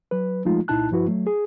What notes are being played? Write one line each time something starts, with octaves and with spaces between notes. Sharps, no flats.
F#3 B4
F3 G#3 A3 D#4 F4
C2 A#2 D#4 E4 A5 F#6
G2 F3 E4 F#4 B4
F#3 A3
G#4